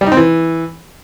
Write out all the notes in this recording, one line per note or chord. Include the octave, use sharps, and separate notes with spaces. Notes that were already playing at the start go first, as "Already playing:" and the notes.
G3
D#4
C4
E3